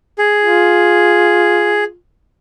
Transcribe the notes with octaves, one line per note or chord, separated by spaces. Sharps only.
G#4
F4